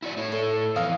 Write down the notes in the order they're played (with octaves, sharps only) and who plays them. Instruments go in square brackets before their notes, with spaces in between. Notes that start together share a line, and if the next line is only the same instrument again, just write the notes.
[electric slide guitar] E4 F#4 D5
A2 A3 C#5
[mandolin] A4
[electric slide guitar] F2 E3 [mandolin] D#5 F5